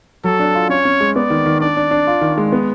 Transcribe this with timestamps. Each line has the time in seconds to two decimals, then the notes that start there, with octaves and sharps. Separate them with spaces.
0.24 F#3 A4
0.40 D4
0.55 F4
0.69 C#4 C#5
0.85 C#4
1.01 G#3
1.16 B3 D5
1.30 D#3
1.46 D#3
1.61 D4 D5
1.77 D4
1.91 D4
2.07 F4
2.21 D#3
2.38 G#3
2.52 B3